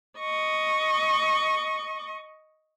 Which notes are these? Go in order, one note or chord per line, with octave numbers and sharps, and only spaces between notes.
D#5 C#6